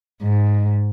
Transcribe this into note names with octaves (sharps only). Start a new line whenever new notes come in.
G#2